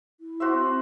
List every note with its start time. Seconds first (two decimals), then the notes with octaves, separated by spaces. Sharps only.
0.20 E4
0.40 F#4 C5 E5
0.53 C4